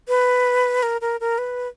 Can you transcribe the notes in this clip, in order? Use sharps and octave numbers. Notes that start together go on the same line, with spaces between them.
B4
A#4
A#4
A#4
B4